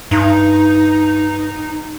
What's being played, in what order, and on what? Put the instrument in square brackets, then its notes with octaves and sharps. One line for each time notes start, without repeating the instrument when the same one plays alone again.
[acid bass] G2 [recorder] D#4